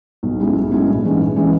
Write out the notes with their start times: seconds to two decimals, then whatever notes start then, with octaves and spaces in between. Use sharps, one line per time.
0.23 B1
0.40 B2 G#3 C#4 E4
0.55 B1
0.71 B2 G#3 C#4 E4
0.87 A#1
1.03 G#2 E3 G#3 C#4
1.19 A#1
1.36 E3 G#3 C#4